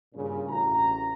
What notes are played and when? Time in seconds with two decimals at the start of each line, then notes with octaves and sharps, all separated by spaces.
0.15 G2 A#2 C#3
0.48 A1 A2 F#4 A#5